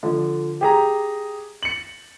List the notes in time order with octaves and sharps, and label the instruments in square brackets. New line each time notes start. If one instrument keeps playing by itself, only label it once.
[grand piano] D3 F3
G4 G#4 A#5
C#7 F#7